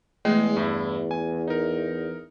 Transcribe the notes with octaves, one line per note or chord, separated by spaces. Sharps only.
E2 G#3 A3
G2 E4
G#5
D#4 A#4